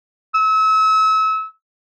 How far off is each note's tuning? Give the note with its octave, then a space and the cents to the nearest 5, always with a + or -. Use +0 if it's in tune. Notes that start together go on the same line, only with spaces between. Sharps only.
E6 -35